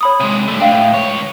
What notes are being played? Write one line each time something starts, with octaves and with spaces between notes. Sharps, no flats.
C#5 B5 D#6
C3 G#3
G2 A3
A3 D4 F5 G5
A2
C#2 C#5